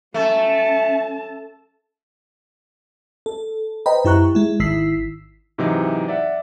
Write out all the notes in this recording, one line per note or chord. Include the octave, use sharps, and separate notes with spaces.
A3 C#4 A5
A4
B4 C5 D#5 G5 A#5 B5
F#2 E4 G4 A#5 C#6 F#6
G#3 E4
G#1 D#3 E4 E6 B6 C7
G#2 C3 E3 F#3 D#4
D5 E5 F#5